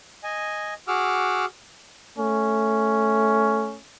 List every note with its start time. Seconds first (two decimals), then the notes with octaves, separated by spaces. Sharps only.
0.23 D#5 G#5
0.88 F#4 G#4 F#5 D6 E6 F6
2.18 A3 C#4